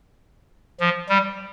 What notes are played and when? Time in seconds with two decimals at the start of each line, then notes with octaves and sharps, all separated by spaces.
0.81 F3
1.09 G3